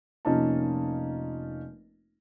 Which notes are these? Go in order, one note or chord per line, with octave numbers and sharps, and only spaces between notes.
F1 A#3 C#4 D#4 F4 A5